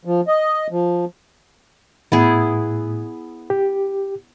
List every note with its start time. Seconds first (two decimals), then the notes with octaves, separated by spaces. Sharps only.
0.05 F3
0.28 D#5
0.70 F3
2.12 A2 B3 E4 G#4
3.50 G4